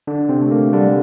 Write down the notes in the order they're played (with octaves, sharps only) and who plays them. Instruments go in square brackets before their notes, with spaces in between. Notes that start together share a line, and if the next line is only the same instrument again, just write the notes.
[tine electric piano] D3 D4
C3 C4
[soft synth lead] A3
[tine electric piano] A#3
[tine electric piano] D3 D4 [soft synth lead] G3